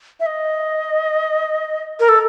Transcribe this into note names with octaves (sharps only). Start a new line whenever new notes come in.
E5
D#5
A#4
A4